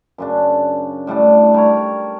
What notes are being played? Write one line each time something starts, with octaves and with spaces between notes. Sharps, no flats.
F#2 C#3 D4
A2 G3 A3 D4
G3 A#4 C#5